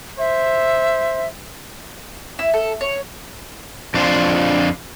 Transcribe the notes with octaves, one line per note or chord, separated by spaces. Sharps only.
C5 E5
E4
A4
C#5
F2 D4 F4 C5